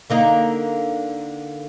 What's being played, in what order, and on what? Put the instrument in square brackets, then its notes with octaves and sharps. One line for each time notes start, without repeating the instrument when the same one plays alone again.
[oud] D3 A#3 D#4